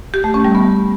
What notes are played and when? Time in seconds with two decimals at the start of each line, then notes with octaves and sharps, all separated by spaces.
0.14 G4
0.24 A3
0.34 C#4
0.45 G3
0.55 B3